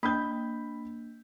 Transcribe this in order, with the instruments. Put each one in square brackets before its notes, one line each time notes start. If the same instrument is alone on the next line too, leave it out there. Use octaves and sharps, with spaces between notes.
[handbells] A#3 D4 [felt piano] B5 G6